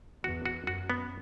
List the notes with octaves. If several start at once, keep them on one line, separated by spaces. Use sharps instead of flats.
E2 F#4
F#4
F#2 F#4
B3